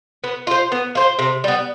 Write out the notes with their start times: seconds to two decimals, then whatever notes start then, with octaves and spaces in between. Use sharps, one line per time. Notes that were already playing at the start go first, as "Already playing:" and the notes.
0.24 B3
0.47 F4 C5
0.72 B3
0.95 F4 C5
1.19 C3
1.44 G3 B3